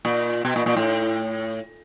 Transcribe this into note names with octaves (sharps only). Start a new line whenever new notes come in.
A#2
B2
A#2
A#2
A2